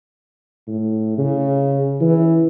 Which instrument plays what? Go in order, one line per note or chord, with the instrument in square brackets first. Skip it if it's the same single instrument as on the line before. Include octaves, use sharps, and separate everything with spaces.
[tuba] A2
C#3
E3